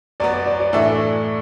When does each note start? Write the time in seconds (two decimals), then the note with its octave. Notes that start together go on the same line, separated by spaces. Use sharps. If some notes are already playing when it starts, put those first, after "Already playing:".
0.20 F#2 F#3 B3 D5
0.34 D5
0.46 D5
0.60 D5
0.73 A2 E3 D4 A4 E5
0.87 D5